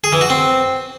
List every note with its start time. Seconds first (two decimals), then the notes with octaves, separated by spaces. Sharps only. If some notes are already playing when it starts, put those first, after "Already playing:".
0.04 G#4
0.13 E3
0.21 F#4
0.30 C4